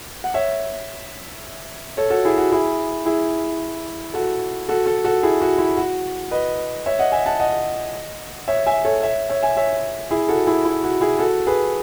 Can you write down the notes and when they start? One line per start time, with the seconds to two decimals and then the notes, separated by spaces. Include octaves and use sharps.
0.24 F#5
0.34 C#5 E5
1.97 A4 C#5
2.10 F#4 A4
2.25 E4 G#4
2.38 F#4
2.52 E4 G#4
3.05 E4 G#4
4.14 F#4 A4
4.69 F#4 A4
4.86 F#4 A4
5.05 F#4 A4
5.23 E4 G#4
5.41 F#4
5.58 E4
5.77 F#4
6.31 B4 D#5
6.86 C#5 E5
6.99 D#5 F#5
7.12 E5 G#5
7.26 F#5 A5
7.40 D#5 F#5
8.48 C#5 E5
8.66 E5 G#5
8.85 A4 C#5
9.03 C#5 E5
9.29 C#5 E5
9.43 E5 G#5
9.57 C#5 E5
10.11 E4 G#4
10.29 F#4 A4
10.47 E4 G#4
10.65 E4
10.84 F#4
11.01 E4 G#4
11.19 F#4 A4
11.47 G#4 B4